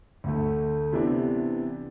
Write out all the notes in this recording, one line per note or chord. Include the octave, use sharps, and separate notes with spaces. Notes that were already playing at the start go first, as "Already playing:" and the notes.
D2 D3 A3
C3 E3 B3 D4